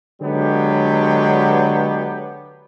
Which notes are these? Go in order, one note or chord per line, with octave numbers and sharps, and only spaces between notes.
D3 F#3 G#3 B3 D4 G4